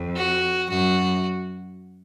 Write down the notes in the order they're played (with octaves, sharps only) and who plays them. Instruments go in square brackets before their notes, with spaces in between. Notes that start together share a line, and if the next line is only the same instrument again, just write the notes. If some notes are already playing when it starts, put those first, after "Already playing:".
Already playing: [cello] F2
[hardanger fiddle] F#4
[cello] F#2 [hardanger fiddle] F#4